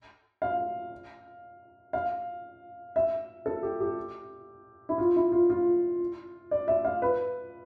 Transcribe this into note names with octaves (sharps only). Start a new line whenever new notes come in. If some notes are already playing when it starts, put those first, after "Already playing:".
F5
F5
E5
A4
G4
G4
E4
F4
E4
F4
F4
D5
E5
F5
B4